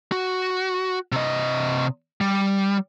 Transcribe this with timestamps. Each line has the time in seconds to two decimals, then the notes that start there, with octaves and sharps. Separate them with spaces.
0.12 F#4
1.12 C3 D#5
2.21 G3